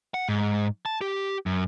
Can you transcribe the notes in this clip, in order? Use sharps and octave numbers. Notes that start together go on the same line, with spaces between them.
F#5
G#2
A5
G4
F#2